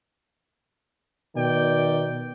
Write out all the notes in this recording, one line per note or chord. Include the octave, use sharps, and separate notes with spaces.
B2 D#3 D5 G5